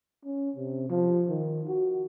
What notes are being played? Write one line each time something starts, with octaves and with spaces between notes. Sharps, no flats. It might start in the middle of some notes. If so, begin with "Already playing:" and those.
C#4
C3
F3
D#3
F#4